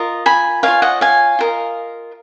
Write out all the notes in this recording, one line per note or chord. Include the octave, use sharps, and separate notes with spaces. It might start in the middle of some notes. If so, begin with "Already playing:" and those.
Already playing: F4 A#4 D#5
G#5 B5
F4 A#4 C#5 F5 G#5
D#5 F#5
F5 G#5
F4 A#4 D#5